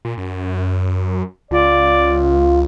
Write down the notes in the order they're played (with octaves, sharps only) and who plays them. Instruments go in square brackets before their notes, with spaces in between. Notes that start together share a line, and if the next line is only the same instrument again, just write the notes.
[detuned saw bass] A#2
F#2
[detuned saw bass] C#2 [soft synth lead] F4 [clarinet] D5